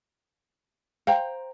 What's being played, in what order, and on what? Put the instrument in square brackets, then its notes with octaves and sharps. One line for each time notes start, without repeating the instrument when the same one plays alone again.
[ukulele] C5 G5 A#5 [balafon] F5